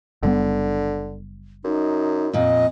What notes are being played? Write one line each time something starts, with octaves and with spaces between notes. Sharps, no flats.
F#1 D3 G3 B3
F#2 D#4
F2 A#2 D#5